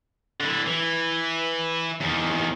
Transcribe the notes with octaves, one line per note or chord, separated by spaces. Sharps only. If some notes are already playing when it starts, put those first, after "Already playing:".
D3 E4
E3
E2 D#3